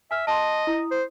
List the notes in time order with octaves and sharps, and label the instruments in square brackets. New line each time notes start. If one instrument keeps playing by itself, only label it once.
[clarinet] E5 [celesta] G#5 F6
[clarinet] D#5 [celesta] A5 C6
[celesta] E4 D#6
[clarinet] C5